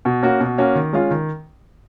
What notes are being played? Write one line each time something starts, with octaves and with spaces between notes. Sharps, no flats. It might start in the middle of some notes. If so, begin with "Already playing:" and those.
B2
A#3 C#4 F#4
B2
A#3 C#4 F#4
D#3
G#3 C#4 F4
D#3